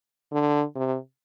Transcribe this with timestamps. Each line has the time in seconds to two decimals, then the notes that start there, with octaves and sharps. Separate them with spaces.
0.32 D3
0.76 C3